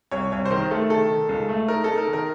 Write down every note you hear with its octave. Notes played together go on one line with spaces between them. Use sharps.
C2 C#5
C2 C#5
C5
D#3 A#4
A3 A4
D#3 A4
D#3
C#2
A3
D#4 A#4
D#4 A4
A#4
D#3
A#4